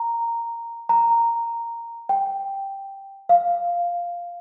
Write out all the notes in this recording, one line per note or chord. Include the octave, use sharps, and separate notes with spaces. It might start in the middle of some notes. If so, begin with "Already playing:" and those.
Already playing: A#5
A#5
G5
F5